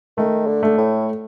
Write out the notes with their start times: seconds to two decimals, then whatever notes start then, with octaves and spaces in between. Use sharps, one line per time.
0.18 D#3 A3
0.47 D3
0.63 A3
0.78 A2